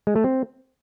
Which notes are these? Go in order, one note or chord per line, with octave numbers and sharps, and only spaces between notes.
G#3
A3
C4